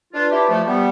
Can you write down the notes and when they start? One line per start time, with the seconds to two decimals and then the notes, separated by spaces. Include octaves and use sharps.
0.13 D4 F4 B4 D5 A5
0.31 E4 G4
0.49 F3 A3
0.66 G3 B3